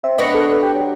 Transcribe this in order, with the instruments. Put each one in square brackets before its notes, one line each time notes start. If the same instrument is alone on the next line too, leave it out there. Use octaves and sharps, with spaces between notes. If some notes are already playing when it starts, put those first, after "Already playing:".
[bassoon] C4 [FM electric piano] E5
[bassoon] B3 [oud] D4 B4 C#5 [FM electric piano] D#5 A#6 C#7
[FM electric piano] A4
[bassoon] G4
F#3